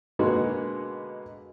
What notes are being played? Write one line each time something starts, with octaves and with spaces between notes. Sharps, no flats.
B2 D3 G#3 A#3 B3 F#4